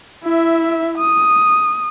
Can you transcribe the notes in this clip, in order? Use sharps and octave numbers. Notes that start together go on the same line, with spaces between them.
E4 E5
D#6